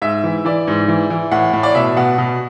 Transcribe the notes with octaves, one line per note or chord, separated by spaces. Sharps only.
G#2 E5
E3
E3 D5
G#2
E3
E3
A2 F#5
A2
D5
B2 E5
B2 F#5
B2